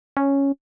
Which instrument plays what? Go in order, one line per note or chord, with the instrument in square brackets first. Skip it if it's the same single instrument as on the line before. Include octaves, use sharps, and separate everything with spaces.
[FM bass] C#4